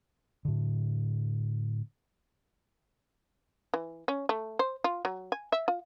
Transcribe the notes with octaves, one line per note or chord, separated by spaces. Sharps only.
A2 D3
E3
C#4
A3
C5
F4
F#3
G#5
E5
F4